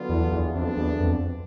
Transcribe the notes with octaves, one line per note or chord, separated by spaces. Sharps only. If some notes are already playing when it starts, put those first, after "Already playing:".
Already playing: D3 F#3 B3 D4 F4
E2
E2
F2 D3 F#3 B3 D4
E2
F2